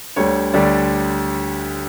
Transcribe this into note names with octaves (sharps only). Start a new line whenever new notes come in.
D2 D3 G3 C#5
D2 D3 G3 D5